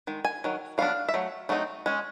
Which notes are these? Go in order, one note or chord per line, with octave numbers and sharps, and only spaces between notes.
D#3 G#3
G#5
D#3 F#3
F#3 B3 D4 F5
E5
F#3 A3
F#3 A3 C4 D#4
G#3 C#4